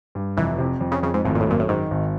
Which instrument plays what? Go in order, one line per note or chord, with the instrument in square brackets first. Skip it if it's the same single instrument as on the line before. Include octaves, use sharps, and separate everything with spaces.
[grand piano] G2
[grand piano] F1 [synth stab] E3
[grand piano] C3
F2
[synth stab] C#3
[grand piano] F2 [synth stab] C#3
[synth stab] G#2
[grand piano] G#1 [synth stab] A2
[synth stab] A#2
A2
[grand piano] F#2 [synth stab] A#2
[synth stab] A2
[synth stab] G#2 [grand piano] D#3
[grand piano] G#1